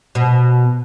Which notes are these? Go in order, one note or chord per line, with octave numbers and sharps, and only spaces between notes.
B2